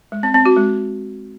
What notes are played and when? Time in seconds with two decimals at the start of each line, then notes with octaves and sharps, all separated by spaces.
0.12 G#3
0.23 C4
0.34 C4
0.46 F#4
0.57 G#3